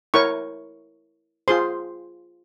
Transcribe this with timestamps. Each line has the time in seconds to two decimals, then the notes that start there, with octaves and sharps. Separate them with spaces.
0.14 E4 A#4 C#5 C#6
1.48 F4 G#4 C5 C6